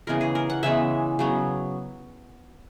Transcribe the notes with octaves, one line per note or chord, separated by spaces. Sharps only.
C#3 E3 G#3 B3 A#4
G#4
A#4
F#5
C#3 E3 G#3 B3 E5
C#3 F#3 B3